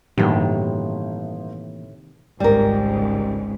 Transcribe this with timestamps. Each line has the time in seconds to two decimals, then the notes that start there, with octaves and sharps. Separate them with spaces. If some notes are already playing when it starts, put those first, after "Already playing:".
0.18 G1 A2 C3 D#3 E3 A#3 F#4
2.40 G#1 C#2 G#2 G3 A#4